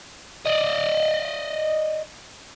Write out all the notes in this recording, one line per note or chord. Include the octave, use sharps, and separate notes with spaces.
D5 D#5